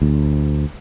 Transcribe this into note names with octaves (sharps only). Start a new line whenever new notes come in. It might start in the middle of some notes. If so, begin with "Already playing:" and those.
D2